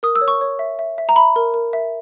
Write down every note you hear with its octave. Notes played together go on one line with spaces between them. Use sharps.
A#4 D#6
E6
C#5
C#6
C#5
E5
E5
E5
A#5
E5 B5
A#4
A#4
E5